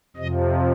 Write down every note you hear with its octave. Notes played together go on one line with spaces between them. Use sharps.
F2 C3 F3 D#5